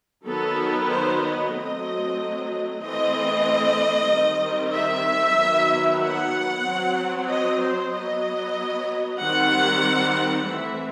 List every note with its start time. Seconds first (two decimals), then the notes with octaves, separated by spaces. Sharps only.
0.25 D#3 F#3 B3 A4
0.89 C5
1.21 D#5
1.53 F#3 A3 C4
2.80 E3 A3 C4 D#5
4.08 D#3 G3 C4
4.72 E5
5.36 D#3 F#3 B3
6.00 F#5
6.64 F#3 C4
7.28 D#5
7.60 C5
7.91 F#3 B3 D#5
9.20 D#3 G3 C4 F#5
10.47 E3 A3 C4 E5